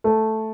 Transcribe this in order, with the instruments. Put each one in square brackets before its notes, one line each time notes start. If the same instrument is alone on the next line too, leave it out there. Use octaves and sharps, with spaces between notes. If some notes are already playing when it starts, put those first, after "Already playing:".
[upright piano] A3